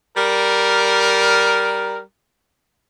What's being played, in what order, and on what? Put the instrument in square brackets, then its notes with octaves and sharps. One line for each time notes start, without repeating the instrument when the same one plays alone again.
[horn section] G3 A#4